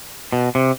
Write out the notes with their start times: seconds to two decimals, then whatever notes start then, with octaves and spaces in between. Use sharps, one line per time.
0.32 B2
0.55 C3